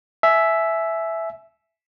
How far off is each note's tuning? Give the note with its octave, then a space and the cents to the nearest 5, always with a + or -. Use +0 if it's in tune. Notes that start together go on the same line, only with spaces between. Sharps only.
E5 +0 G#5 +30